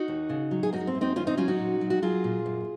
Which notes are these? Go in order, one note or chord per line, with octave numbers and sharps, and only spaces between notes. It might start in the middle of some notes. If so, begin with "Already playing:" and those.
Already playing: D#4 F#4
D#2
C#3
F#3
G#4
F#2 D#4 F#4
C4
F#2
C4 D#4
D#3 C#4 F4
C4 D#4
F#3 C#4 F4
D#4 F#4
A#2
F#3
F#4
F#3 F4 G#4
A#2
F#2